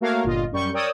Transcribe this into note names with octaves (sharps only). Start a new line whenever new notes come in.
A3 A#3 F#4 A#4 C#5 F5
G1 A#2 F4 D#5
F#2 G3 C#6 G6
A#4 C#5 D5 G5 D#6 E6